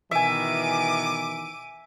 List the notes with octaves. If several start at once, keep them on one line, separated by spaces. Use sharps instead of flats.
B2 D#3 E3 E5 G#5 D6 D#7